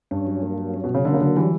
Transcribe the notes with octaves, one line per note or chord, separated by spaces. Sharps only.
G2 C#4
F#3
A#3
F#3
C#4
B2
F#3
C#3
D3 A#3
C#3
D3 F#3
E3 G3